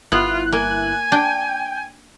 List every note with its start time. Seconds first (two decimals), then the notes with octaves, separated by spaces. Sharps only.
0.12 G1 B3 E4 F4 F#6
0.53 A#3 G#5
1.12 D4 G5